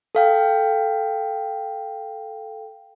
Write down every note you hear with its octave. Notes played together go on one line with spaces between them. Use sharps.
A4 F5 G5